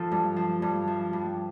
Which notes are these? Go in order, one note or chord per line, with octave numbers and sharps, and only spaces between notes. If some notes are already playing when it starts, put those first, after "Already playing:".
Already playing: F3 F4 A4
G2
F3
G2
F3
G2